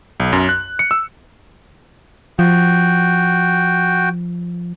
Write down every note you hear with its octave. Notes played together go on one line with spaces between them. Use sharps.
B1
F#2
F#6
C#7
E6
F3 F#4 G5